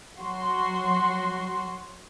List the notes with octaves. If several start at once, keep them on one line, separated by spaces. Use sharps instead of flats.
F#3 F#4 C6